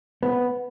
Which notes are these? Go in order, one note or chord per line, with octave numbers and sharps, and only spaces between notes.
B3